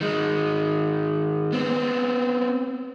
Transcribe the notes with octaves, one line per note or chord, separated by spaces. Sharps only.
D#3 G#3
B3 C4